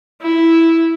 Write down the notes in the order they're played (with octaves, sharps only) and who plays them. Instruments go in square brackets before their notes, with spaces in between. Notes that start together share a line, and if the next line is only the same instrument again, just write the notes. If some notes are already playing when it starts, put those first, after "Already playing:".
[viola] E4